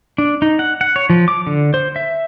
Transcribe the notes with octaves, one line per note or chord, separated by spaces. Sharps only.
D4
D#4
F#5
F#5
C#5
F3
D6
D3
C5
E5